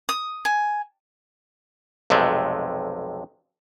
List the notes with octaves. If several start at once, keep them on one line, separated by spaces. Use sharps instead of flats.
D#6
G#5
B1 F2 C3 G#3 A3